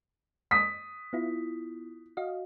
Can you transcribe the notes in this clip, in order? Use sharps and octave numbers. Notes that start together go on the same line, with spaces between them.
D#6 B6
B3 E4 F4
F#4 D#5 F5